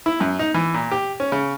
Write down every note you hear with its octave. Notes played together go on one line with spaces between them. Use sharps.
E4
F#2
D#4
E3
A#2
G4
C#4
C#3